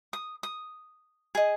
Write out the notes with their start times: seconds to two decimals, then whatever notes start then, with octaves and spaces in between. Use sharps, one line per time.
0.13 D#6
0.43 D#6
1.35 G#4 D#5